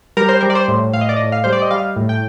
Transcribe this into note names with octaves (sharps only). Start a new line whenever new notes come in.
G3 A#4
C5
G3 A#4
D5
C5
A2
A2 F5
D#5
D5
D#5
A2
F5
G3 C5
D5
D#5
G3 F5
A2
G5